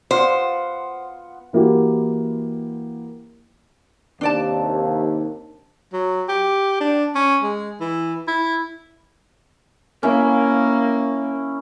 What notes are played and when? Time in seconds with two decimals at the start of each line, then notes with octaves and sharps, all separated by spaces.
0.11 B3 F4 C5 F#5
1.53 E3 A#3 E4 F#4 G4
4.21 D#2 C3 D4 D5 A5
5.93 F#3
6.29 G4
6.80 D4
7.15 C#4
7.42 G#3
7.80 E3
8.28 E4
10.03 A#3 C#4 E4 F5